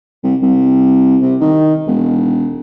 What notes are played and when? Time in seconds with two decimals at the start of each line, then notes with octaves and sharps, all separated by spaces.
0.23 C2
0.42 C2
1.21 C3
1.40 D#3
1.87 E1